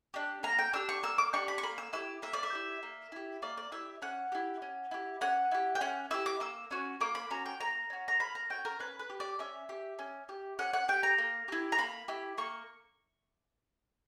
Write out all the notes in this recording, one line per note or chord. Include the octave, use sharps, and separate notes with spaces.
D4 G4
A#3 A#5
G5
D4 G4 E6
C#6
A#3 E6
D6
D4 G4 C#6
B5
C#6
A#3 B5
E6
E4 G4 E6
A#3 E5
D5
E5
E4 G4
A#3
E4 G4
A#3 D5
D5
E4 G4 E5
C#4 F#5
E4 G4
C#4
E4 G4
C#4 F#5
E4 G4
G5
C#4 F#5
E4 G4 E6
D6
A#3 E6
C#4 F#4
A#3 D6
B5
C#4 F#4 A#5
G5
A#3 A#5
C#4 F#4
A#5
A#3 B5
A#5
C#4 F#4 G5
A#4
C#4 B4
B4
G4
D5
C#4 E5
G4
C#4
G4
C#4 F#5
F#5
G4 G5
A#5
A#3
E4 G4
A#5
A#3 B5
E4 G4
A#3 C#6